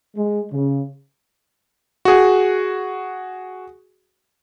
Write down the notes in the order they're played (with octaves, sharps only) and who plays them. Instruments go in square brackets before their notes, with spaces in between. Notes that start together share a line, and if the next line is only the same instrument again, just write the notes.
[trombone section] G#3
C#3
[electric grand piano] F#4 G#4